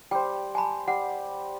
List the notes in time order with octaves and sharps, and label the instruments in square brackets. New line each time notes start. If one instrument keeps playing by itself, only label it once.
[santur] G3 C5 [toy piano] G5
[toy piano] G#5 A5 B5
[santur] G3 [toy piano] F#5